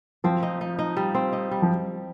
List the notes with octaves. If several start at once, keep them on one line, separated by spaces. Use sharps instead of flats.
F3 C4
D#4
D#4
D#4
G3
C4
D#4
G3
F3